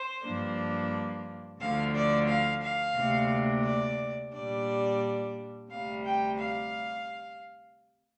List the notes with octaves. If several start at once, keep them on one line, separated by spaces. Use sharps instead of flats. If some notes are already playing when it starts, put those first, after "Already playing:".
Already playing: C5
G2 F3 A#3 D4
D2 D3 F3 D4 F5
D5
F5
F5
D2 C3 A#3 D4
D5
A#2 G3 D4 D5
D2 C3 G3 F5
G5
F5